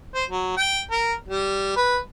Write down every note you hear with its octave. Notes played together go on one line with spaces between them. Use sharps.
C5
F#3
G5
A#4
G3
B4